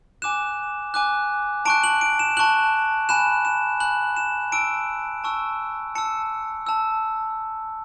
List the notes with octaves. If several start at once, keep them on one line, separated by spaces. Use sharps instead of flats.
G#5 D6 F#6 E7
G#5 D6 F#6
A5 C#6 F#6 D7
F#7
D7
E7
A5 C#6 F#6 F#7
G#5 B5 F#6 E7
E7
G#5 B5 F#6 F#7
E7
A5 C#6 E6 D7
A5 C#6 E6
A5 E6 C#7
A5 E6